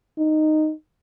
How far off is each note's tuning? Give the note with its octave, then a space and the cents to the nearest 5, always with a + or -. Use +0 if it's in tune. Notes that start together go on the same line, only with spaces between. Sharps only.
D#4 -10